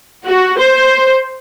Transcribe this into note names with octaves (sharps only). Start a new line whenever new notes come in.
F#4
C5